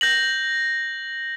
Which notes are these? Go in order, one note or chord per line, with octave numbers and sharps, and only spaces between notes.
G6 A#6 F#7